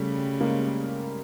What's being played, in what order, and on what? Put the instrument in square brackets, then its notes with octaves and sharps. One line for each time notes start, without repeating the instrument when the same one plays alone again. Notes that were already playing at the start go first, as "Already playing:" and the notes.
Already playing: [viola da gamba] C#3 [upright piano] G3 A3
[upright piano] G#3 A#3